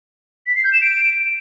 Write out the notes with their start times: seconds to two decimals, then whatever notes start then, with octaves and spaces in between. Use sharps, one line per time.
0.47 B6
0.55 C7
0.64 G6
0.73 E7
0.81 D7